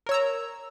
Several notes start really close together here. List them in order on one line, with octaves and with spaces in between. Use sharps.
A#4 C#5 E6 A#5